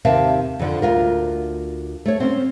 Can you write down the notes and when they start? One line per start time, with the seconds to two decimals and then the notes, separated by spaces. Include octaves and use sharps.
0.05 D#2 C3 A#4 E5 F5 A5
0.59 F2 D3 F3
0.82 D2 F4 A#4
2.06 A3 C#5
2.20 C4 C#4